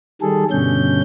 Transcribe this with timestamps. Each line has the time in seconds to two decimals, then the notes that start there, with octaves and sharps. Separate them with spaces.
0.22 D#3 G3 G#4 A4
0.51 G2 B2 D3 C#4 G6